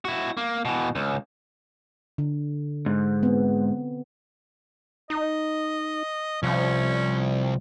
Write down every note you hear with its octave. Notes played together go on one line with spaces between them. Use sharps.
E4 F#4
A#3
B2 E3
C#2
D3
G#2
B3 C4
D#4 D#5
C2 F3 C#4